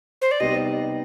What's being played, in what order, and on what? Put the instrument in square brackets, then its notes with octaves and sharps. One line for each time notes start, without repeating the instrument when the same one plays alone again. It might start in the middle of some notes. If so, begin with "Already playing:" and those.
[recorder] C5
D5
[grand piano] C3 G3 B3 D#4 G4 [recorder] D#5